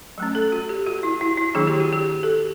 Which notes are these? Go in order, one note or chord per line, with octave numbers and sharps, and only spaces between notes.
F#3 A3 C#4
A4
F#4
G4
F#4
E4
E4
E4
D#3 F#3 A#3 D4 G#4
G4
F#4
G4
A4